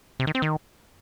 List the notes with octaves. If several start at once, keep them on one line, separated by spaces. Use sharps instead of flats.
C3
D#3
C4
D#3